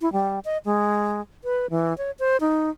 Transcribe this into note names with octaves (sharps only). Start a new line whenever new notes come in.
E4
G3
D#5
G#3
B4
E3
C#5
C5
D#4